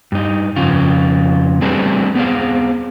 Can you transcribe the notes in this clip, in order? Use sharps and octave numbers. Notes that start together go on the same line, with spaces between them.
G2 D#4
F2 C#3 F4
G3 A3 C4 D4 G#4 B4
B3 C4 G#4 F5